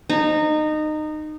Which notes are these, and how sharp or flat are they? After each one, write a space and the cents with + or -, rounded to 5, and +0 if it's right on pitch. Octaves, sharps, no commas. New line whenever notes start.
D#4 -20